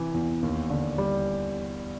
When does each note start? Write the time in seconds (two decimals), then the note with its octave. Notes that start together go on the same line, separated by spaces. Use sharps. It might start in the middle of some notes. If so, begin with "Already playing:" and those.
Already playing: C3 E3
0.14 E2
0.43 D#2
0.70 D3
0.98 G3